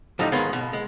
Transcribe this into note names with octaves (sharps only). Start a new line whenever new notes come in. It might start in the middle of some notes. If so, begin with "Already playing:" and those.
A2 F3 G3 D#4
G#2 D#3 B3 C#5 F5 C6
B2
G#3